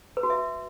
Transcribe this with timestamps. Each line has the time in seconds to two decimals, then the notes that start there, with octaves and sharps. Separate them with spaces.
0.17 B4
0.23 F#4
0.30 E5